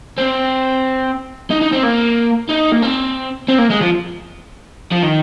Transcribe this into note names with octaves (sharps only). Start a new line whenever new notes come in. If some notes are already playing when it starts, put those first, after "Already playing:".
C4
D#4
D#4
C4
A#3
D#4
A#3
C4
C4
A#3
G#3
F3
F3
D#3